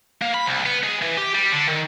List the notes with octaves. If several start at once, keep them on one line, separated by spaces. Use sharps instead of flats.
A#3
B5
C2
B3
G#3
E3
G4
G3
D3
D#3